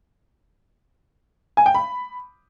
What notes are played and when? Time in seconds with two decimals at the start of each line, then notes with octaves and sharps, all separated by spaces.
1.57 G#5
1.66 G5
1.75 B5